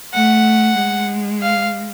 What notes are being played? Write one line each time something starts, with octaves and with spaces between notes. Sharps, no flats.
A3 F#5
G#3
F5